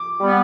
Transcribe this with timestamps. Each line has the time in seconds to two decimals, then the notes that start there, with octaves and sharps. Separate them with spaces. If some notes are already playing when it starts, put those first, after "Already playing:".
Already playing: D6
0.20 G3 B3